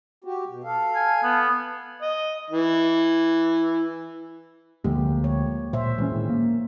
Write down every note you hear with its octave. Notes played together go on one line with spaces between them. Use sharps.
F#4 G4
B2
A4 F5
G#5
B3
D#5
E3
D2 D3 F3 G#3 A#3 G4
C#5
A#2 C5 E5
A#2 E3 G#3 C#4
A2 D#3
A#3